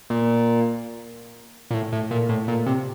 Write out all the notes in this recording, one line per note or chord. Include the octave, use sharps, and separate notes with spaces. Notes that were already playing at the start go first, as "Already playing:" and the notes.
A#2
A#2
A2
A2
A#2
A2
A#2
C3